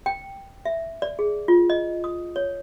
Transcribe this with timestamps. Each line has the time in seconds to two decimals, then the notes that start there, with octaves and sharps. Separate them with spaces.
0.06 G5
0.65 E5
1.02 D5
1.19 G#4
1.48 F4
1.70 D#5
2.04 D#6
2.36 C#5